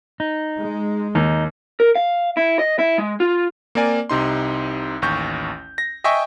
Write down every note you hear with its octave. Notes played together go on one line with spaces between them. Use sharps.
D#4
G#3
D#2 D#4
A#4
F5
E4
D#5
E4
G#3
F4
A#3 C4 A#4 D5 G#5
C2 C3 D#4 C6
A1 D#2 C#6 G6
A#6
D#5 E5 G5 G#5 C#6